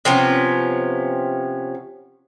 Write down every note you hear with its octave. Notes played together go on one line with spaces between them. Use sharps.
C3 F3 B3 C#4